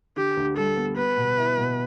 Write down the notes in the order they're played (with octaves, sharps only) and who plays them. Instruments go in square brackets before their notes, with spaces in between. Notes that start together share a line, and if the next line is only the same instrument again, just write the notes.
[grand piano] D3 [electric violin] G4
[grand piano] D2
[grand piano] G3 [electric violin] A4
[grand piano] B3
[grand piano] B3 [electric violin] B4
[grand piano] B2
E4
B2